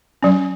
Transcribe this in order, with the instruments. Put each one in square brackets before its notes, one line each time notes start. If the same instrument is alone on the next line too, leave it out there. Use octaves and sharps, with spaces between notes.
[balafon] F#3 C#4